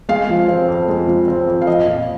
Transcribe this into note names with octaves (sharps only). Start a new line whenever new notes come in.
G#3 F5
F3
C4
F2
G#3
F3
C4
F2
F5
F3 D#5
A#2